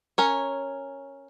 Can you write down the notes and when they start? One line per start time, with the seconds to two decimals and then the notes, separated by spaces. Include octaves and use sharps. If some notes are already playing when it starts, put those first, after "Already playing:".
0.18 C#4 A#4 C#5